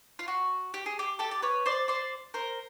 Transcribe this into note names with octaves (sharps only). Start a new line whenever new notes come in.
F4
F#4
G4
G#4
G4
G4 A4
D5
B4 C#5
C5 D5
C5 D5
A#4 C5